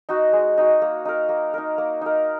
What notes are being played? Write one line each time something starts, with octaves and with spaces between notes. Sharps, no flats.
D#4 F#4
G#3
D#4 F#4
A#3
D#4 A#4
A#3
D#4 A#4
A#3
D#4 A#4